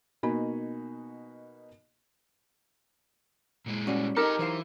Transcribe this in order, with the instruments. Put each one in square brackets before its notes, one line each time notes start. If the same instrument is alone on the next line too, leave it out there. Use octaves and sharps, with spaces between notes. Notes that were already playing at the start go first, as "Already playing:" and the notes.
[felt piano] B2 A#3 D#4 F#4 G#5 B5
[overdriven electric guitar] A#2 G#3
[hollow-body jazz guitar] G3 C#4 F#4
[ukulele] D#4 G4 A#4 [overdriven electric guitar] A4 D#5
[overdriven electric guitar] E3 [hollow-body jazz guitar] F#3 C5 F5